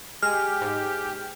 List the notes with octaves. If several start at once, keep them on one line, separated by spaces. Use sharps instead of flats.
G#3 G4 G#4 G#5 F6
G#2